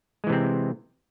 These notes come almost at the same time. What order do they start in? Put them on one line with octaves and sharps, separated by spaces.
G#3 E3 C3 C4